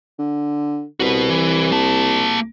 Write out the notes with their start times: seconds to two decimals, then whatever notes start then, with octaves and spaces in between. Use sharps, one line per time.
0.19 D3
1.00 C2 F#4 B4
1.30 E3
1.72 A#3 A5